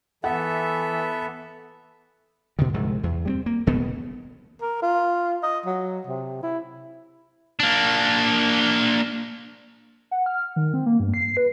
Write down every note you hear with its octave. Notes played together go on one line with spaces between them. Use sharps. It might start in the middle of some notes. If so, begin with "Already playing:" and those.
E3 B3 A4 E5 F#5
B2 D3 D#3
C2 G#2 C3 F3
E2
G3 A#3 C4
A#3
E1 B2 D#3 B3
A#4
F4
D#5
F#3
C3
E4
A#3 D4
F#5
F6
D#3
C4
A#3
G2
C7
B4